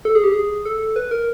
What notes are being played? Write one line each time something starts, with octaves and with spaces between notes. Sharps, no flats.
A4
G#4
G4
G#4
A4
B4
A#4